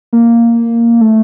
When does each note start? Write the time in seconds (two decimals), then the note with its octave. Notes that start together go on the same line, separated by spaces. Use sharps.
0.13 A#3
1.01 A3